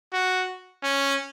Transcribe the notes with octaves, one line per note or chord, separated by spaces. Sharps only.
F#4
C#4